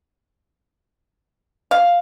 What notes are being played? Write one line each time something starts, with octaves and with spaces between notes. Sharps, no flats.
F5